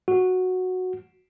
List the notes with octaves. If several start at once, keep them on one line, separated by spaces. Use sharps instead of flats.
F#4